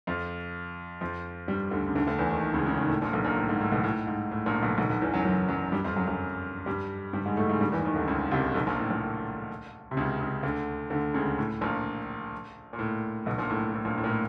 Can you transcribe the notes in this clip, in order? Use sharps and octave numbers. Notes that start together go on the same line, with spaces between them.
F2 F3
F2 F3
G2 G3
D2 D3
C#3
D2 D3
D2 D3
E2 E3
D#2 D#3
C#2 C#3
C#2 C#3
D#2 D#3
A2
A#1 A#2
B1 B2
A#1 A#2
A2
G#2
A2
B1 B2
A2
G#2
A2
A#1 A#2
B1 B2
B1 B2
B1 B2
E2 E3
F#2 F#3
F#2 F#3
F#2 F#3
G2 G3
F2 F3
F#2 F#3
F#2 F#3
G2 G3
G2 G3
G#2 G#3
A2 A3
G#2 G#3
G2 G3
D#3
E2 E3
D#2 D#3
D2 D3
C#2 C#3
C2 C3
B1 B2
A#1 A#2
A2
A#1 A#2
C3
C#2 C#3
C#2 C#3
D2 D3
D2 D3
C#2 C#3
A2
A#1 A#2
A#2
A2
B1 B2
A#1 A#2
A2
A2
A#1 A#2
A2
A#2
A2